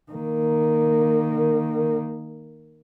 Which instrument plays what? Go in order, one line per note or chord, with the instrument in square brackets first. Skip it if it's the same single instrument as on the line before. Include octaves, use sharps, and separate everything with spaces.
[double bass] D#3 A#3